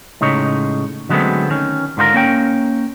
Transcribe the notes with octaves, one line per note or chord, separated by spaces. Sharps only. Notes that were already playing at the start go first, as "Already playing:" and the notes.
A2 C#3 G#3 D#4 C#5
D3 F#3 G#3 A3 B3 C4
D#3 C#4
G#2 D3 F4 F#4 A#4
A#3 C#4 G5